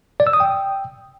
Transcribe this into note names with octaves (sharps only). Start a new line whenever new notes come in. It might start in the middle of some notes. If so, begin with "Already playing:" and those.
D5
E6
D#6
G5